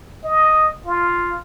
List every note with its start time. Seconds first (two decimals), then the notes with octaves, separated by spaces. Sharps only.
0.24 D#5
0.86 F4